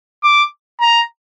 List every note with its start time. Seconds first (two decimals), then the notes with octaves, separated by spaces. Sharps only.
0.24 D6
0.81 A#5